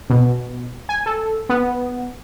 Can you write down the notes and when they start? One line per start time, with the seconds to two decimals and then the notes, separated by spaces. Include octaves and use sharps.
0.10 B2
0.89 G#5
1.06 A4
1.49 B3